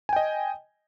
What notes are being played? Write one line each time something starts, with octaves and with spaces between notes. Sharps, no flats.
D#5 G5 G#5